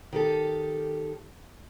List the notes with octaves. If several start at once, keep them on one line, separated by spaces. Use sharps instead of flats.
D#3 G4 A4